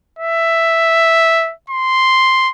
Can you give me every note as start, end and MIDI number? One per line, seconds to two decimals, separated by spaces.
0.19 1.53 76
1.70 2.50 84